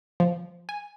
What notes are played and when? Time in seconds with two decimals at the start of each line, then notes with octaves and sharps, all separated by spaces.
0.20 F3
0.69 G#5